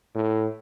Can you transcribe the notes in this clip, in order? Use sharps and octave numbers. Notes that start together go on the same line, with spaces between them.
A2